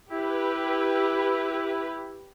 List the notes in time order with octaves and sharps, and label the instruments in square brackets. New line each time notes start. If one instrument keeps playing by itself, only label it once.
[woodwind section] E4 [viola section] G4 B4